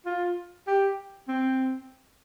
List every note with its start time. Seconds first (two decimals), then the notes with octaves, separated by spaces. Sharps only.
0.06 F4
0.67 G4
1.28 C4